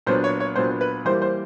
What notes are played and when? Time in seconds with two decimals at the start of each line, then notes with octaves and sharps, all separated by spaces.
0.07 A#2 F#3 B3 D4 C5
0.24 C#5
0.40 C#5
0.56 A#2 F#3 B3 D4 C5
0.81 B4
1.05 E3 G3 A#3 C5
1.22 C5